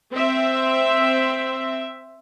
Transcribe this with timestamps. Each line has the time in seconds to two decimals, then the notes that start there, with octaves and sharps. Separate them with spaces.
0.11 C4 E5